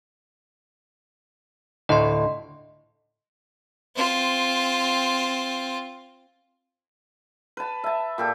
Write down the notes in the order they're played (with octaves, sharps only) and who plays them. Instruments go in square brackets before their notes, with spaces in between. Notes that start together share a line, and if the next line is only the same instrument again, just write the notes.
[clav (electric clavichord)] D2 A2 [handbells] D#5 C6
[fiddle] C4 F4
[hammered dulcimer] B4 A5
E5 A5
A#2 G4 A4